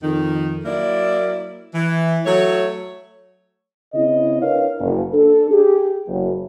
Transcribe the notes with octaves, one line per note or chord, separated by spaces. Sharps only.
F2 D#3
F#3 A#3 E4 D5
E3
F#3 A3 C#5
C#3 C4 E4 D#5
D4 E4 A#4 B4 C#5 F5
F#1
D4 A4
G4 G#4
F#1